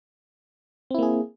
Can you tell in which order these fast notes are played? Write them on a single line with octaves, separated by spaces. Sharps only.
C4 E4 A#3 G#4